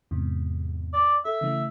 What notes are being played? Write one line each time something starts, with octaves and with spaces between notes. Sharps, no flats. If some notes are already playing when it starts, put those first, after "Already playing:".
E2 G#2 C3
D5
A4 E5
C#3 E3 A3